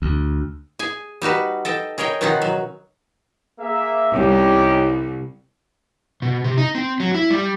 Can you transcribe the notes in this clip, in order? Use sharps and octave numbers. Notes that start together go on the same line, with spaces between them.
D2
G#4 G#5
G3 D#4 F#4 B4
A4 D#5 G5
G#4 A#4 C#5 D#5 G5
B2 D#3 C#4 D#4 F4 F#5
F#3
A#3 G#4 E5
C2 C#4 D#4 G4
B2
C3
D#4
C4
F#3
E4
G3